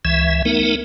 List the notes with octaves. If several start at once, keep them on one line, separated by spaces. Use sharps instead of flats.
C#2 E3 E5
A3 B3 D#4 A#4